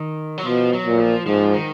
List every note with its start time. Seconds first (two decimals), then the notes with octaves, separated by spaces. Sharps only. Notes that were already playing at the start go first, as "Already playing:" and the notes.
Already playing: D#3
0.38 F#3
0.45 B2 F3
0.73 F#3
0.87 A#2
1.00 F3
1.26 G#2 F3
1.53 D#3